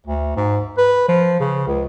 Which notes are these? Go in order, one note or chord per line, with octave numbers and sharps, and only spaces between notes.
D2
G#2
B4
F3
C#3
C#2